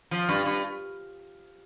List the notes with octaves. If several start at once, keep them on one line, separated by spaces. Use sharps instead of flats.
F3
G2
G2